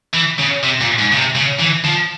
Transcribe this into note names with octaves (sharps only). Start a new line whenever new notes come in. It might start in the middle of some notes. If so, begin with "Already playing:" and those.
E3
C#3
C3
A#2
G#2
C#3
C3
C#3
E3
F3